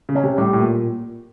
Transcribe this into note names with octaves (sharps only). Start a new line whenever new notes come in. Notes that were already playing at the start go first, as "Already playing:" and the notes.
C#3
C#4
C3
A2 G3
A2
A#2